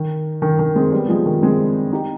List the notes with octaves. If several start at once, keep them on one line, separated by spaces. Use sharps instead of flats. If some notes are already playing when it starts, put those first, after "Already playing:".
Already playing: D#3
D#3
D#3
G#3 C4
G3 B3
F3 G#3
D#3
G#3 C4
D#4 G4